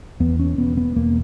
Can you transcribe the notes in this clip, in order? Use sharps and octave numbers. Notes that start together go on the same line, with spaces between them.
E2 B3
C#4
E1 B3
B3
E1 A#3